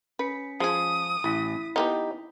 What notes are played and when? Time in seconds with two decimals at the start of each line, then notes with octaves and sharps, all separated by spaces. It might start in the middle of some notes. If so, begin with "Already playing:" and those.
0.19 C#4 B4 B6 C#7
0.60 F3 G#3 G#4 D#6
1.24 A1 E4 B6
1.76 E3 A#3 B3 D#4 G4